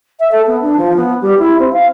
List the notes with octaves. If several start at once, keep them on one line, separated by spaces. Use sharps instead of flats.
E5
A4
B3
D4
F3
B3
G3
E4
C4
F5